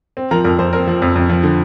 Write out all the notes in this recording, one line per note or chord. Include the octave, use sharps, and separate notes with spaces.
C4
F3 A#4 A#5
F2 A#4
F2 C5
C4 A#4
F3
F2
F2
F3
D3